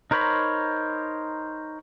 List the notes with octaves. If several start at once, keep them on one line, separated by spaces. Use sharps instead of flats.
D#4 A#4 C5 C#5 B5